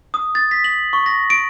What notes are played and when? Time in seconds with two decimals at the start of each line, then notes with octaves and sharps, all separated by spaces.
0.14 D#6
0.35 A6
0.51 B6
0.64 F#7
0.93 C#6
1.06 A#6
1.30 D7